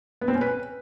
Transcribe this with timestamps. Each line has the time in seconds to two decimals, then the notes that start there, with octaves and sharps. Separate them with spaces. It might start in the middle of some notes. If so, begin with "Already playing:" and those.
0.21 B3
0.28 C4
0.35 C#4
0.41 B4